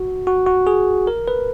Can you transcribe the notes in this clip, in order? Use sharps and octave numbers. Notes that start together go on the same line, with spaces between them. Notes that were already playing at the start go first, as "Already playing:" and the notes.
Already playing: F#4
F#4
F#4
G#4
A#4
B4